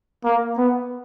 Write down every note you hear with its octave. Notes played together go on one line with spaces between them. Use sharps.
A#3
B3